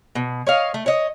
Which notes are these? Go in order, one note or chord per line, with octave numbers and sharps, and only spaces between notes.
B2
C#5 D#5 F5
A3
C#5 D#5